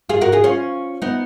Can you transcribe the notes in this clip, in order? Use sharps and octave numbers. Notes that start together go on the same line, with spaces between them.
F4 G#4
F#4 A#4
F4 G#4
C#4 F4
B3 D#4